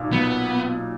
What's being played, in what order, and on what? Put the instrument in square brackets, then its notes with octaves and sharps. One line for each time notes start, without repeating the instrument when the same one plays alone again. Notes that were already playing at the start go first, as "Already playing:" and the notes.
Already playing: [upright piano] B1 A#2
[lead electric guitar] B3